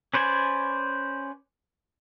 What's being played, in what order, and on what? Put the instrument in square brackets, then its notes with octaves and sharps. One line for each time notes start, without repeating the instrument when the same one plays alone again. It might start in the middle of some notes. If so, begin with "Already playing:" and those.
[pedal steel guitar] C#4 B4 C5 D5 G#5